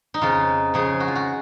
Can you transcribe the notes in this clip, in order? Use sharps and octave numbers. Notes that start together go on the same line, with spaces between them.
D#4
F2 C#3 F3 F4
F2 C#3 F3 G#4
F#4
F4
F#4